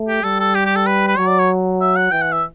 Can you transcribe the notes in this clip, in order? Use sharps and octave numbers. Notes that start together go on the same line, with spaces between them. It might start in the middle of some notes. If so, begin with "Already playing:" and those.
Already playing: A3
G4
G3 A4
A4
G4
G4
A4
B4
B4
F#3 C#5
D5
C#5
E5
F#5
E3 G5
F#5
E5